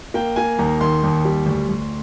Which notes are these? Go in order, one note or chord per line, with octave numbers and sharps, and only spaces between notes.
A#3 G5
A#3 G#5
D#2 A#5
D#3 C6
D#2
G3
D2
D2